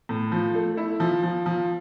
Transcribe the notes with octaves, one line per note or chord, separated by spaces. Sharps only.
A2
F3
A3
E4
F3
F3
F3